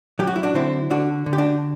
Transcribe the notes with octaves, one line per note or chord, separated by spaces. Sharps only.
F#3 G4
F#4
E4
D4 F#4
D3 C4 E4
D3 D4 F#4
D3
G4
D4 F#4